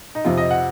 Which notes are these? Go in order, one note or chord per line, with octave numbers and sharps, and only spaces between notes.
D#4
F2 C3 F3 F4
D#5
F#5